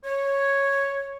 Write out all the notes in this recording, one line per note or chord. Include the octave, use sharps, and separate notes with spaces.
C#5